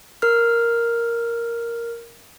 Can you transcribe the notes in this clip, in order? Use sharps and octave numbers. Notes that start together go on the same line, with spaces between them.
A#4 F6